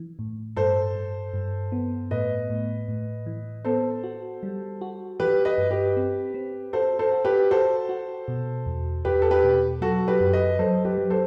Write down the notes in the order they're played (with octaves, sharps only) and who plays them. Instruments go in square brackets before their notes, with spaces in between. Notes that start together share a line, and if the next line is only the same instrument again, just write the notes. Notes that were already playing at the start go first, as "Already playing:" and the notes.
Already playing: [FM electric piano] E3
A2
[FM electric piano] G2 [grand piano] A4 C5
[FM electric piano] G2
G2
B3
[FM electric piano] A2 [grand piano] B4 D#5
[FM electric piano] A2
A2
E3
[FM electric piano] B3 [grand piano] A4 C5
[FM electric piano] F#4
G3
F#4
[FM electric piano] E3 [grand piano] G4 B4
[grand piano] B4 D#5
[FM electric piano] G2
[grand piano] G4 B4
[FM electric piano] C4
C4
[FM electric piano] F#4 [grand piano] A4 C5
[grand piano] A4 C5
[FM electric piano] F#4
[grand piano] G4 B4
[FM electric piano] F#4 [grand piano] A4 C5
[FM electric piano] F#4
B2
E2
[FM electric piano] E2 [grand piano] G4 B4
[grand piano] A4
G4 B4
[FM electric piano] B2
[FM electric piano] F#3 [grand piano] F#4 A4
[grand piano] G4 B4
[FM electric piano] F#2
[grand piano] B4 D#5
[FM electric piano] F#3 [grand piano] A4 C5
[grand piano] G4 B4
[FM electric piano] F#3
[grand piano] A4 C5